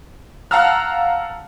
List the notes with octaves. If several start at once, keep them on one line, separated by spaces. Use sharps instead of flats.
F5 F#5 A5 A#5 E6 F6